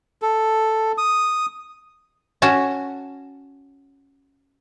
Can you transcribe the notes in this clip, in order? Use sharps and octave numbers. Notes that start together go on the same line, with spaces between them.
A4
D#6
C#4 F#4 A5